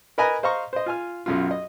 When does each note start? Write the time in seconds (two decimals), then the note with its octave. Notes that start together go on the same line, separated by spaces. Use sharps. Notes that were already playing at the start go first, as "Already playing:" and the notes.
0.18 A#4 B4 D#5 G#5 A#5 B5
0.43 C5 D#5 F5 A#5 C#6
0.73 C5 D#5
0.86 F4 G#5 F6
1.26 B1 F#2 F4
1.51 D#5